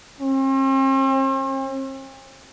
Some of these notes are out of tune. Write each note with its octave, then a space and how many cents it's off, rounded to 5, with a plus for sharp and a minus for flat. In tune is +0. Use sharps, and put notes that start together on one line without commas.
C4 +45